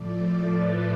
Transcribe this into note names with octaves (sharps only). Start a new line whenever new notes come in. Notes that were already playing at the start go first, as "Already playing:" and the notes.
Already playing: A2 F3 A3 D5
B4